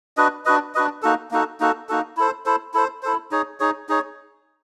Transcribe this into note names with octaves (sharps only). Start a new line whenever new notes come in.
D4 F#4 B4 D#5
D4 F#4 B4 D#5
D4 F#4 B4 D#5
A#3 D#4 F#4 A4
A#3 D#4 F#4 A4
A#3 D#4 F#4 A4
A#3 D#4 F#4 A4
E4 A4 C5
E4 A4 C5
E4 A4 C5
E4 A4 C5
D#4 G#4 C#5
D#4 G#4 C#5
D#4 G#4 C#5